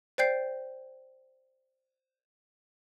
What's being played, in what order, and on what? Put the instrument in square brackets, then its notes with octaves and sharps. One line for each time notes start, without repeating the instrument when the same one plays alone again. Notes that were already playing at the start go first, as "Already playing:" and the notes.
[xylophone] C5 D5 G5 G6 C7